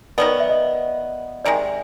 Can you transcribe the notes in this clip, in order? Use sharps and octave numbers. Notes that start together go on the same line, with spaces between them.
D#3 F#3 B3 D5
E5
D#5
C3 D#3 G#3 D5